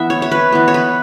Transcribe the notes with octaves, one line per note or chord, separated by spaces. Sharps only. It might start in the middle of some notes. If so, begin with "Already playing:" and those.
Already playing: E3 B3 E5 F#5
C#5
C#5
B4
E3 B3
C#5
B4